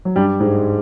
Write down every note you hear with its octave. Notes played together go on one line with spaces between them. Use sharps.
F#3
G2 G3
G#2 G#3